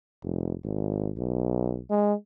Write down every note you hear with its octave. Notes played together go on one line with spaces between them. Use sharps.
F1
G#1
B1
G#3